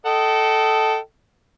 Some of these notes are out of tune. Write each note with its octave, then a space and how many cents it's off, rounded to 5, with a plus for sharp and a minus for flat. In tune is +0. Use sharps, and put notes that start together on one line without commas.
A4 +0 D#5 +0 G5 -40